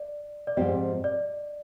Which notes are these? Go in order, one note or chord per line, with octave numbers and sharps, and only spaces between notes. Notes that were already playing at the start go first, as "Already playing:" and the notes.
Already playing: D5
D5
G#2 F3 C4 G4 D#5
D5